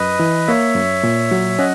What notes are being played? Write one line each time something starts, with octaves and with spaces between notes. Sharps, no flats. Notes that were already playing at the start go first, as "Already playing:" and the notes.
Already playing: F#2 B4 D#5
E3
A#3 C#5 E5
F#2
A#2
F#3
C#4 D#5 F#5